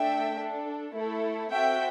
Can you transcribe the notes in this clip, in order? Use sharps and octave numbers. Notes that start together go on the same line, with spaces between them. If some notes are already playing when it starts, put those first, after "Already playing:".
Already playing: A3 D4 A4 E5 G5
D4 A4
A3 E4 A4
C4 F#4 A4 E5 G5